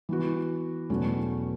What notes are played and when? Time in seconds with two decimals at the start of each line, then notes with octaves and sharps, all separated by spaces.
0.09 E3 B3 F#4
0.89 E2 B2 F#3 A3 C#4